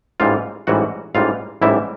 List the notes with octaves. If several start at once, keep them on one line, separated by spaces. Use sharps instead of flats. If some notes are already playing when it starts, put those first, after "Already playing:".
A1 G#2 E3 G3 F4 F5
A1 G#2 E3 G3 F#4 F#5
A1 G#2 E3 G3 F4 F5
A1 G#2 E3 G3 E4 E5